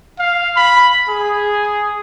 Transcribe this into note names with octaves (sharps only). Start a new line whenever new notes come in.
F5
B5
G#4